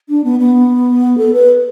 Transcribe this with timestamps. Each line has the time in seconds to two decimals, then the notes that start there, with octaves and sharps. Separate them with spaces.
0.09 D4
0.24 B3
0.39 B3
1.18 A4
1.33 B4